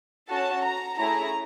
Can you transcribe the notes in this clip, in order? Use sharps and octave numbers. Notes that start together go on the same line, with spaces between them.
C#4 F#4 A4 A5
A#5
A3 C#4 E4 G#4 A#5